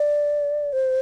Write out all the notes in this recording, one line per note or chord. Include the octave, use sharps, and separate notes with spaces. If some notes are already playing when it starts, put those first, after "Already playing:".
Already playing: D5
C5